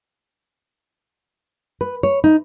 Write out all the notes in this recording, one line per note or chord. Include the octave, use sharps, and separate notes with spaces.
B4
C#5
D#4